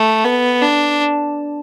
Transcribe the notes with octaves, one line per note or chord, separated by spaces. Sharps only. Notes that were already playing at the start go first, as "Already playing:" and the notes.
Already playing: A3
B3
D4